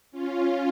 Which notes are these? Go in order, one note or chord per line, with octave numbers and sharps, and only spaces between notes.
C#4 F4